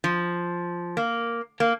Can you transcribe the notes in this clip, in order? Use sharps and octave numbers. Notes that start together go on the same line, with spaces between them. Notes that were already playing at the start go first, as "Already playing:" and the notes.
F3
A#3
A#3